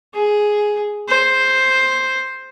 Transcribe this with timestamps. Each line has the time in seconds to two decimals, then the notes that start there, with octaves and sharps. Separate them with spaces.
0.14 G#4
1.08 C5